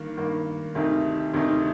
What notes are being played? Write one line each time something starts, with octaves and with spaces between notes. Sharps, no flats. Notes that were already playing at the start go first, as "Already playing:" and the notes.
Already playing: G2 D#3 A#3
G2 D#3 A#3
D2 C3 D#3 A3 D#4
D2 C3 D#3 A3 D#4